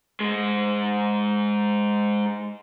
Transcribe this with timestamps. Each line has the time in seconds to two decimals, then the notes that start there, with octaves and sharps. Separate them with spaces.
0.20 G#2 G#3